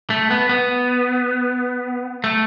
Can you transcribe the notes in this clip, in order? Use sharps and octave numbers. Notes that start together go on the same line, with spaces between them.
A3
B3
B3
A3